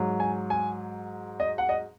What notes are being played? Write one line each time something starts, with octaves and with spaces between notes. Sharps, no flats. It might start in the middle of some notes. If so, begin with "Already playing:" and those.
Already playing: G#2 F#3
G#5
G#5
D#5
F#5
D#5